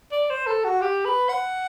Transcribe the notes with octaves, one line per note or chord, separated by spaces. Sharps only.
D5
C5
A4
F#4
G4
B4
F#5